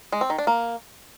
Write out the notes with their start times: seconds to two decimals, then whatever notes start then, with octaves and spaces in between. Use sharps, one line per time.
0.12 G#3
0.21 C4
0.30 D#3
0.38 D4
0.47 A#3